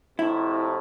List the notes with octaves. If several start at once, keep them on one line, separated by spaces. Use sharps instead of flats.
F2 A2 C3 E4